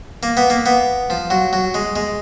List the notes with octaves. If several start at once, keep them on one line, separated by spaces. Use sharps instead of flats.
A#3
B3
A#3
B3
F3
F#3
F#3
G#3
G#3